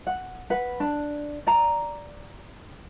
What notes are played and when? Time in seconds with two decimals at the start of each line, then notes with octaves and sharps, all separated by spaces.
0.07 F#5
0.50 B4 F#5
0.80 D4
1.47 D5 A#5